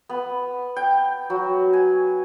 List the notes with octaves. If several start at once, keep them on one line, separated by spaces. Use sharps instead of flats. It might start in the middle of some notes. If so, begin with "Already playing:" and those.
B3
G5
F#3
G#5